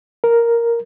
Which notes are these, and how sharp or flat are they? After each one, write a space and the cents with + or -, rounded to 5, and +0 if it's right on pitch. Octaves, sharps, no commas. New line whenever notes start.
A#4 +0